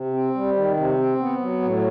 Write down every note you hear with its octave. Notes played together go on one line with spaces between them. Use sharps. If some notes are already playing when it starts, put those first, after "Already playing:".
Already playing: C3
C4
G3
D#3
C3
C4
B3
F#3
A2